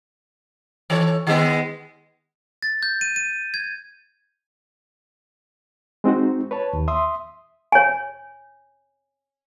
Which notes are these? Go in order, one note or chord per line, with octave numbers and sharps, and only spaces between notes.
E3 A4 C#5
D#3 G#3 B3
A6
G6
D#7
D#7
G#6
G#3 C4 D#4 F#4
B4 C#5 A5
D#2
E5 C6 D#6
C#5 G#5